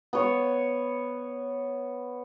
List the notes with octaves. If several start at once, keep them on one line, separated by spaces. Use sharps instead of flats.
B3 C#5